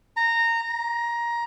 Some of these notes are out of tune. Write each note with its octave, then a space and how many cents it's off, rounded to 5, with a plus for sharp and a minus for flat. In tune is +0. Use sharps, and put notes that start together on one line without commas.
A#5 -15
A#5 +15